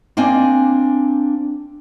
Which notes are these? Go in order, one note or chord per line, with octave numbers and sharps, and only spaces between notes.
A#3 C4 D4 D#5 G#5